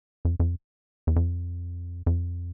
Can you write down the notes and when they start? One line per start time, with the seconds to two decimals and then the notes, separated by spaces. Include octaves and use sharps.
0.25 F2
0.40 F2
1.07 E2
1.16 F2
2.06 F2